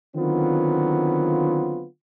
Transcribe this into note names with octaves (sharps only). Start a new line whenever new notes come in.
D3 D#3 F#3 B3 C4 F4